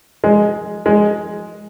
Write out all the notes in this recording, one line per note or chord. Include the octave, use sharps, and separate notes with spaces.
G#3
G#3